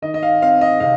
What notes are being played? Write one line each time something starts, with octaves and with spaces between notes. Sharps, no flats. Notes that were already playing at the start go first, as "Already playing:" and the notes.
D#3 D#5
D#5
F5
C4 F5
D#5
C3 F5